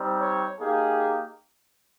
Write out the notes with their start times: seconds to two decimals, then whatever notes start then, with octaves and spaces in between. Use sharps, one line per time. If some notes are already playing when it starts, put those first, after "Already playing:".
Already playing: G3 C4 D#4
0.22 C#5
0.59 A#3 D#4 G4 G#4